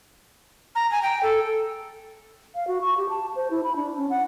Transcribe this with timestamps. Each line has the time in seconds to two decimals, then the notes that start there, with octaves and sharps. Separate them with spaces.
0.75 A#5
0.92 G#5
1.03 G5
1.23 A4
2.55 F5
2.68 F#4
2.81 C#6
2.98 G4
3.09 A5
3.36 C5
3.51 E4
3.64 B5
3.76 D4
3.97 C#4
4.10 F#5